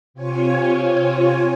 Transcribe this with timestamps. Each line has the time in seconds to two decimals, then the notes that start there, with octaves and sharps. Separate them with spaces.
0.14 C3 C4 F4 C#5 G#5